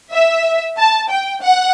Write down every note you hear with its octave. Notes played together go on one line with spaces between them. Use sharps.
E5
A5
G5
F#5